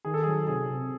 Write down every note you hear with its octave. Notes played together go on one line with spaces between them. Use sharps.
D#3 G#4
A4
G#4
F#3
C3 G#4
C3